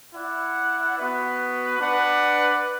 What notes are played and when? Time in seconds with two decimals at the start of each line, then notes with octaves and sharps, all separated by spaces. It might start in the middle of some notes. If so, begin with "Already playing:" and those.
0.13 E4 D5 F#5
0.97 B3 F#4 B4
1.80 D4 B4 D5 F#5